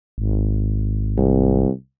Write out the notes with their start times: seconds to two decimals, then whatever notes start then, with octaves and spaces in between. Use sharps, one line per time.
0.18 G#1
1.17 C2